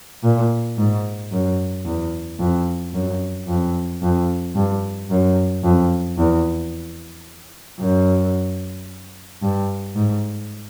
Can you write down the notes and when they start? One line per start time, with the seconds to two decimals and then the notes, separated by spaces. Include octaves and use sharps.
0.23 A#2
0.78 G#2
1.32 F#2
1.85 E2
2.39 F2
2.94 F#2
3.48 F2
4.02 F2
4.55 G2
5.10 F#2
5.63 F2
6.18 E2
7.80 F#2
9.42 G2
9.96 G#2